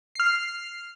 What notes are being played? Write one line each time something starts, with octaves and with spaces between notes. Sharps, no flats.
F6 C7